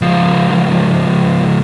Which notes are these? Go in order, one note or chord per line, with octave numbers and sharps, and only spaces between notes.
C#2 F3